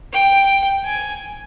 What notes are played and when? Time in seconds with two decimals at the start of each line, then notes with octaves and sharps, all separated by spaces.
0.13 G5
0.85 G#5